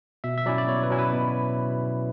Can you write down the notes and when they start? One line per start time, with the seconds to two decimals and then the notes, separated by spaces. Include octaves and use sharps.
0.24 B2 E5
0.38 E5
0.46 F#3 C#4 E4 D5
0.58 D5
0.68 B2 C#5
0.83 B4
0.90 F#3 C#4 E4
0.98 B4
1.13 B2